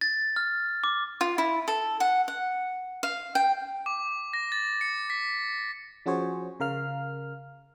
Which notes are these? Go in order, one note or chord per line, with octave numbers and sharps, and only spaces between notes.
A6
F6
D6
F4
E4
A4
F#5
F#5
F5
G5
D6
A#6
A6
C#7
B6
F3 C#4 F#4 G#4 C5 C#5
C#3 A#4 F5 F6